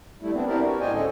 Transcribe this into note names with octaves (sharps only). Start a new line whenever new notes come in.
G3 A3 E4
B3 C4 D4
C4 D4 E4 G4 A#4 D5
F#4
A2 C5 D5 D#5 G5 G#5
D2 D3 G#3 C#4 A4 D#5